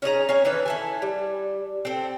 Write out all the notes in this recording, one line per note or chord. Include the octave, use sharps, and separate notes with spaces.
C#4 D#4 G#4 A#5
C#4 F5 G#5
D#3 E3 A4 B4
E4 A4 G#5
G3
C4 A4